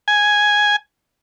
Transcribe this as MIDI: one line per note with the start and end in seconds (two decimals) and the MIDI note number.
0.08 0.76 80